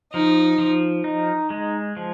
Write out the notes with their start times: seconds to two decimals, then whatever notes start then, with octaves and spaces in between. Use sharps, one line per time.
0.13 F3 D#4
0.58 F3
1.04 D#4
1.50 G#3
1.97 F3